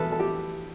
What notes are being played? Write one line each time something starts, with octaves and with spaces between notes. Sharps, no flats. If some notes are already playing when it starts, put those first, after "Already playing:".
Already playing: E2 B2 G3 A4 B4
A4
G4